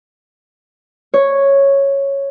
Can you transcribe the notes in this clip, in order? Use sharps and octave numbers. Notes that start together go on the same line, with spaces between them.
C#5